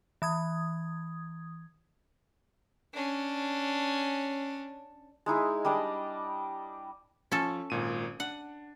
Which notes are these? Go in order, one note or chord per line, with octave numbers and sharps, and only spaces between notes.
E3 D#6 G#6
C#4 D4
G#3 D#4 E4 G#4
G3 D4 D5 D#5
F3 C#4 A4
G#1 A#2 D#7
D4 F#5